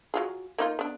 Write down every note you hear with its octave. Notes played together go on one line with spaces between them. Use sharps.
F#3 F4 G#4
A#3 D#4 F4
B3 D4